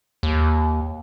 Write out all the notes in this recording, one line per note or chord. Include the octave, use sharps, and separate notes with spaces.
D#2